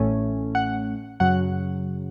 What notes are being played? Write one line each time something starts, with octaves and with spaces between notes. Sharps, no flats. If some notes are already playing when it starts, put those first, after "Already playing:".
Already playing: A1 A2 A3 C#4
F#5
F#2 C#3 F#3 F#5